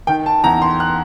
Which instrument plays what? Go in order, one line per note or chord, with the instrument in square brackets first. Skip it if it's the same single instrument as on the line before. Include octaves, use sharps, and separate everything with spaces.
[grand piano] D#3 G5
A5
E2 A#5
C6
F#6